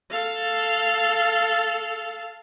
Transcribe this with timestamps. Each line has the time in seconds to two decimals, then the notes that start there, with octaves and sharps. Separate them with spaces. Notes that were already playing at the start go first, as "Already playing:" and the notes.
0.10 A4 F5